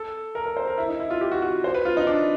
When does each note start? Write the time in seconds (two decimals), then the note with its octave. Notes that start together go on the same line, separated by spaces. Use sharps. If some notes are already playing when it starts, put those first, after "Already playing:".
Already playing: A4
0.35 A#4
0.46 A#4
0.57 C5
0.67 A#4
0.78 E4
0.89 D#4
1.00 E4
1.10 F4
1.21 G4
1.32 F#4
1.42 F#4
1.64 C5
1.75 B4
1.85 F4
1.97 D#4
2.07 D4